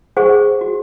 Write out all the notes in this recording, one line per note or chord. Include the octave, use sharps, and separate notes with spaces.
G#4 C5 F#5 C#6
F#4